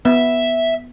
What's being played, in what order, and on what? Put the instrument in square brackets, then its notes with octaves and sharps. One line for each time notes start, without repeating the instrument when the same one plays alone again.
[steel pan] B3 [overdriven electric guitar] E5